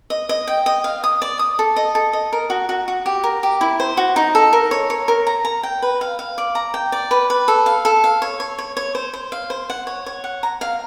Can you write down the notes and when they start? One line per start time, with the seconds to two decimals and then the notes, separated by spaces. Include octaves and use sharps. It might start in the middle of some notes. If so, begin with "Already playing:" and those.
0.10 D#5
0.29 D#5
0.47 G5
0.66 D#5
0.84 F5
1.04 D#6
1.22 D5
1.39 D#6
1.59 A4
1.76 D#5
1.95 A4
2.13 D#5
2.33 A#4
2.50 F#4
2.69 F#4
2.88 F#4
3.06 G4
3.24 A#4
3.43 G4
3.61 E4
3.80 C5
3.97 F#4
4.16 D#4
4.35 A4
4.53 A#4
4.71 C#5
4.90 C#5
5.08 A#4
5.27 A#5
5.45 A#5
5.63 G5
5.82 B4
6.01 F5
6.19 F5
6.38 D5
6.55 A#5
6.74 G5
6.92 D5
7.11 B4
7.30 B4
7.48 A4
7.66 F5
7.85 A4
8.04 F5
8.22 C#5
8.40 C#5
8.58 C#5
8.77 C#5
8.95 C5
9.13 C5
9.32 F5
9.50 C5
9.70 F#5
9.87 C#5
10.06 C#5
10.24 F#5
10.43 A#5
10.61 F5